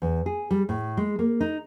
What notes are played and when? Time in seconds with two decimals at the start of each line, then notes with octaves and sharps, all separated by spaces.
0.02 E2
0.26 G#4
0.51 G3
0.69 A2
0.97 G#3
1.19 A#3
1.41 D#4